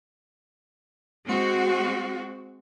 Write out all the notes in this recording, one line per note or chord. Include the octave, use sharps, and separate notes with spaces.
G#3 C4 F#4